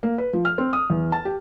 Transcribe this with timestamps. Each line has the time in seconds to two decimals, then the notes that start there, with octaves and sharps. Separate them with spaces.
0.03 A#3
0.18 B4
0.33 F3
0.45 F6
0.58 C4
0.73 D#6
0.90 E2
1.12 A5
1.25 G4